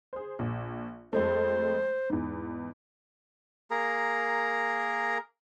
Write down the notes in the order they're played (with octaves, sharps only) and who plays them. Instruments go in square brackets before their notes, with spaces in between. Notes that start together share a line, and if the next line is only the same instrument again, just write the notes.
[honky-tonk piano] G#4 C5
A#1
[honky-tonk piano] F2 G#3 A3 [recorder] C5
[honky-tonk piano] E2 G#2
[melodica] A#3 G#4 A#4 A#5